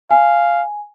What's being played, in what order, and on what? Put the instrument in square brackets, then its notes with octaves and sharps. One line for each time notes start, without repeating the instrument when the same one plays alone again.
[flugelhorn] F5 [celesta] G#5